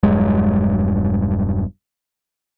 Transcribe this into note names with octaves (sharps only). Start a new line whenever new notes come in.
E1 G2 F#3 G#3